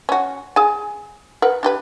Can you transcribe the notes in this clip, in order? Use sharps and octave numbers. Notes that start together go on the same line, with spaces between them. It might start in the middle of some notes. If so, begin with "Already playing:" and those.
C#4 F#4
G#4 G#5
A#4 B4 F#5
D4 G4 B4